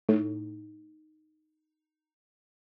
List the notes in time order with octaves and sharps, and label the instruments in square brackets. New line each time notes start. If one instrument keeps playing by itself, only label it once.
[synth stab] A2 [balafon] D#4